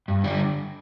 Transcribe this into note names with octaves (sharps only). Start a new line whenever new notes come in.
G2
D3 G3 D4